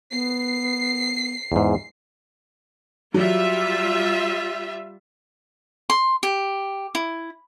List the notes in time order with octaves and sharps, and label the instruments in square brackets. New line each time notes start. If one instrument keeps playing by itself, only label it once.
[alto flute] B3 [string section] C7
[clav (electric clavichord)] E2 G#2
[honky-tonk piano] F#3 [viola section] G3 F4 E5
[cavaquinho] C6
G4
E4